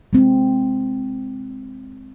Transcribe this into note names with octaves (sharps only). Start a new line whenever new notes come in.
G#3 C4